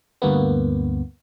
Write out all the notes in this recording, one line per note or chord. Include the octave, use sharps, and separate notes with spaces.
D2 G2 A#3 B3